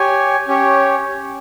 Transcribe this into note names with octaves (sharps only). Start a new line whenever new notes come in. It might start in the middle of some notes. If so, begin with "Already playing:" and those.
Already playing: G4 C#5 G#5
C#4 G4 C#5